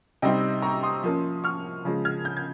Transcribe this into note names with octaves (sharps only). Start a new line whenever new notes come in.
C3 G3 C4 D#4 D#5 G5
A#5 C#6
C6 D#6
F3 A#3 C#4
C#6 F6
C#3 F3 G#3
F6 G#6
G6
G#6